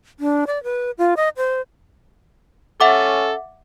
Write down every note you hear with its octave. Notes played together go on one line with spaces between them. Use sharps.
D4
D5
B4
F4
D#5
C5
C#4 A4 E5 F#5 D6